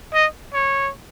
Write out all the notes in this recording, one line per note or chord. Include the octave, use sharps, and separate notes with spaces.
D#5
C#5